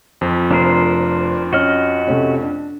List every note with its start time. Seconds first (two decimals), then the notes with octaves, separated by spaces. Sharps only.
0.21 F2 F3
0.51 F1 D4 A#4 C5
1.53 C#4 F#4 D#5 F6
2.07 C3 A3 C#4
2.41 D4